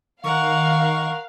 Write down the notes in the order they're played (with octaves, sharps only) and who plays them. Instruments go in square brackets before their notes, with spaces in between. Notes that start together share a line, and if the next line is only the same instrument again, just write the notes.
[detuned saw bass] D#3 [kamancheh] A#4 F#5 [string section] F5 [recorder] C#6